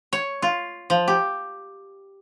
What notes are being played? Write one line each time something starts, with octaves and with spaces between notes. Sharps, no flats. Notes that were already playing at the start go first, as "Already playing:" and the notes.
C#5
F4
F3
G4